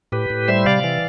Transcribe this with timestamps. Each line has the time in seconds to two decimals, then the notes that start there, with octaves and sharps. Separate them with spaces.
0.12 A2 G4 B4
0.30 A2
0.48 G3 C5 E5
0.66 C3 D5 F5
0.84 E3